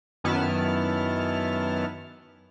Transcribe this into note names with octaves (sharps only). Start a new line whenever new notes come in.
F#2 D#3 B3 E4 A5 F6